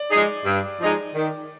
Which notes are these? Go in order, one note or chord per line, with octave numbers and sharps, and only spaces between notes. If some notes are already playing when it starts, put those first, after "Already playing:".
Already playing: D5
F3 G#3 D#4 G#4
G2
F3 G#3 D#4 G#4
D#3